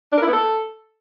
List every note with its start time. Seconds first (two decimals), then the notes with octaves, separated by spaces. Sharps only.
0.12 D4
0.17 A#4
0.23 E4
0.28 B3
0.33 A4